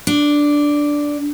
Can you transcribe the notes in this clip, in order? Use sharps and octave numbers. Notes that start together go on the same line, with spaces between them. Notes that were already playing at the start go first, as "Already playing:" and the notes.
D4